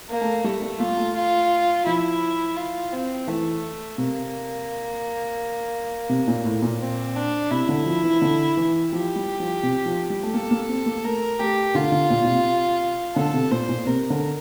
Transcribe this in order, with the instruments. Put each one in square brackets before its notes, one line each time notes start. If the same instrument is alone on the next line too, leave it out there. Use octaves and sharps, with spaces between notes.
[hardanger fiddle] A#3
[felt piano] A3
[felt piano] G3 [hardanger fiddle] A3
[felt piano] G3
[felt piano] A#3 [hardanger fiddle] F4
[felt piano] A3
[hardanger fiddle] F4
[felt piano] F3 [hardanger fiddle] E4
[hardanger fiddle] F4
C4
[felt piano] E3 [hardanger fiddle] A3
[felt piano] C3 [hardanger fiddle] A#3
[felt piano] C3
A#2
A2
A#2
[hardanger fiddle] C4
D4
[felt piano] C3 [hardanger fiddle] E4
[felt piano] D3
F3
E3
D3
E3
[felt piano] F3 [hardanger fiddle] G4
[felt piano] G3
F3
C3
F3
G3
A3
[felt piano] A#3 [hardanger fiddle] A4
[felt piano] A#3
C4
A#3
[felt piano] A3 [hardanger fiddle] A#4
[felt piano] A3 [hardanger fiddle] G4
[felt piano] D3 [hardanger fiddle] F4
[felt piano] D3
A#2
A#2
C3
[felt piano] D3 [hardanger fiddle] A4
[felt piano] C3
[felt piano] A#2 [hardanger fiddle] C5
[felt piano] A#2
[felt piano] C3 [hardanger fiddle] A#4
[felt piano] D3